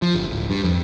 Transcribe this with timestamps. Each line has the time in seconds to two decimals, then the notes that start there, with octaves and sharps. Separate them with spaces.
0.02 F3
0.15 G1
0.30 D1
0.50 G2
0.63 F2